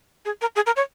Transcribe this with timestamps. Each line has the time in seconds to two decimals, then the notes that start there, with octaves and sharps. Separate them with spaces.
0.25 G#4
0.41 A#4
0.56 G#4
0.66 A#4
0.76 C#5